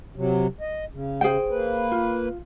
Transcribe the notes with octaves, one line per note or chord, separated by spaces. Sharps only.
C3 F#3
D#5
C#3
G#4 C5 G5
A#3 B4
F4